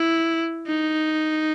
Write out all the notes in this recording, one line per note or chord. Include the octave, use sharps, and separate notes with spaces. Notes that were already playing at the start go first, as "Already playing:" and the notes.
Already playing: E4
D#4